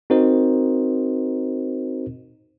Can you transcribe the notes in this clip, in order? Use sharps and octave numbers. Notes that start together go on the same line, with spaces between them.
C4 D#4 F#4 A#4 C5 D#5